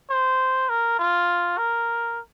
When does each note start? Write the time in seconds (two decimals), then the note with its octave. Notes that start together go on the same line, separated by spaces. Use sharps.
0.10 C5
0.69 A#4
0.99 F4
1.58 A#4